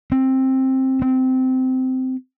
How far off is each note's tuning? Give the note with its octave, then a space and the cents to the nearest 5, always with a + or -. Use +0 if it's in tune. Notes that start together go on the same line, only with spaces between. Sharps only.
C4 +10
C4 -15